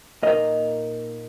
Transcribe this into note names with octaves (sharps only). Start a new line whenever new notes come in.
A#2 A#3 D#4 A#4 D#5